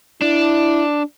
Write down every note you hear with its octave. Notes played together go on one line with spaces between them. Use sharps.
D4 E4